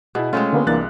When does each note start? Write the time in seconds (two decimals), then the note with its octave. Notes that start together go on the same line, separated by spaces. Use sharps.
0.15 B2 E4 G#4
0.33 G#3 A3 C4 C#4 F4
0.53 D3 A#3 B3
0.66 C2 E3 A#3 D4 F#6 A6